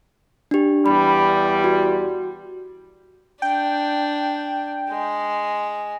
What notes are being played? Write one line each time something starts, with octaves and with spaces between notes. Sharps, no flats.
D4 G4
E2 G3 B5
F#4
D4 G5
G#3